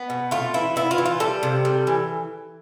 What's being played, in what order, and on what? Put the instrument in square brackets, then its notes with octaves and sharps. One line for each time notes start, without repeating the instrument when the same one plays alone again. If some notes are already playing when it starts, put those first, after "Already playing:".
Already playing: [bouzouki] B3
B2
A3 F4
E3 E4
B3 E4
F4
E3
F4
G3 A4
C3
G3
E3